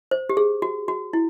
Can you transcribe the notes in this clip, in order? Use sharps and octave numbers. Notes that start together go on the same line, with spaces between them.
C5
G4
G#4
F#4
F#4
E4